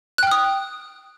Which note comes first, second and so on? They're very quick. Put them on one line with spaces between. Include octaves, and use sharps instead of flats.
F#6 G5 F6 D#6